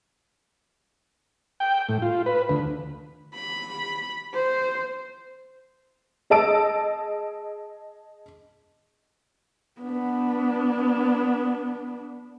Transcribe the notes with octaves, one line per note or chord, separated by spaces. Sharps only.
G5
A2
F4
B4
D2
B5
C5
G#4 D#5 A5 E6 D7
B3 D4